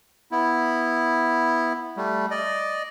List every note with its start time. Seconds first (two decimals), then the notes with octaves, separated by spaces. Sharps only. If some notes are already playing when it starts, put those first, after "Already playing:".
0.32 B3 E4
1.97 G3 A3
2.31 D5 D#5